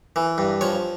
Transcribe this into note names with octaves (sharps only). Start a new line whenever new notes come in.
E3
G2
F3 C#5